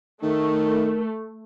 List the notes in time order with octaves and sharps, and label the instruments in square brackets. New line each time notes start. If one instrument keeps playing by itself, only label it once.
[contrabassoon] D#3 [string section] A3 [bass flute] A#4